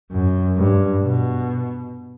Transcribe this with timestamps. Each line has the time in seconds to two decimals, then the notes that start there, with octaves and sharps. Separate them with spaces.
0.11 F#2
0.57 G2
1.03 B2